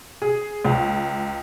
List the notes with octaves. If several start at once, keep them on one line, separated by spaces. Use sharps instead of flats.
G#4
C#2